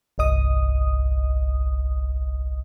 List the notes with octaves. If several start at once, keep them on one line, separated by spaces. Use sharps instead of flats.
G1 C2 D#5 D#6